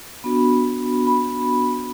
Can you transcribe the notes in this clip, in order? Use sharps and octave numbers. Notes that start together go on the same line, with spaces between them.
B3 D4 F#4 B5
B5